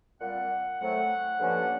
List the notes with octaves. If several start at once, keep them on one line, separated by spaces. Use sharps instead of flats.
A#2 G3 C4 F#5
A2 F#3 A3 C4 F#5
G2 D3 F3 A#3 C#4